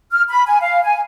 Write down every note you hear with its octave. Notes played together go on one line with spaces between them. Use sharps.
F6
B5
G#5
F5
G#5